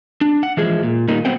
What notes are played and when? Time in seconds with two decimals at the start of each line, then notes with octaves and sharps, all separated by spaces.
0.21 D4
0.43 F#5
0.57 E3 F3 G#3 G#4
0.83 A#2
1.08 A#2 D#3 G3 A#3 D#4
1.25 F#3 B3 C4 C5 F#5 G5